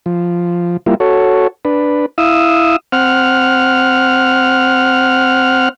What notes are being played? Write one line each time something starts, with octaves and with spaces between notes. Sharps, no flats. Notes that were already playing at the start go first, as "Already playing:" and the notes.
F3
G3 A#3 E4 F4
F#4 A4 C#5
D4 B4
E4 F5 D#6 E6
C4 F#5 F6